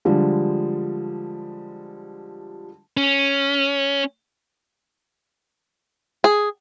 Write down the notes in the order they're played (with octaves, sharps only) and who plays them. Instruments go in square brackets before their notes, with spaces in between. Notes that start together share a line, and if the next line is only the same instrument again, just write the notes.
[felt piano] D3 F3 G3 G#3
[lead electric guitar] C#4
[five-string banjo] G#4